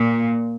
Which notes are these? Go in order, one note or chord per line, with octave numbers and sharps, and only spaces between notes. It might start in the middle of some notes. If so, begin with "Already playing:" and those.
Already playing: A#2